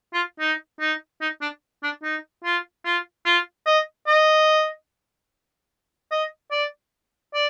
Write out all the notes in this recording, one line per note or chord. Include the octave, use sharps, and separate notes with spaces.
F4
D#4
D#4
D#4
D4
D4
D#4
F4
F4
F4
D#5
D#5
D#5
D5
D5